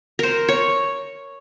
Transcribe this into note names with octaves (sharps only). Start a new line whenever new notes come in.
A#4 C5
C#5